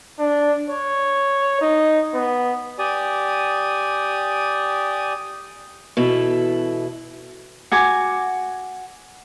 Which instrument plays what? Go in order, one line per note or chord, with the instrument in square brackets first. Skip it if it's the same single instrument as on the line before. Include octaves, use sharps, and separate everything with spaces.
[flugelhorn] D4
C#5
D#4
B3
[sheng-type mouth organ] G4 D5 G#5 D#6
[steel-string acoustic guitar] B2 E3 E4 A4
[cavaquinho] F#4 G#5 D6